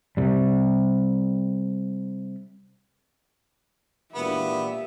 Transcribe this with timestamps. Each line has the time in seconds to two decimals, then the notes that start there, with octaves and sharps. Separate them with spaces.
0.17 C3 G3
4.15 E1 A#2 B3 G4 E5